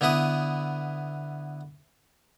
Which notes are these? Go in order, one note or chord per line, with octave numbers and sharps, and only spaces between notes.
D3 B3 E4 B4 D#6